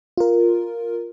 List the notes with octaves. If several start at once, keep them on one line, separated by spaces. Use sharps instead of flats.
F4 A#4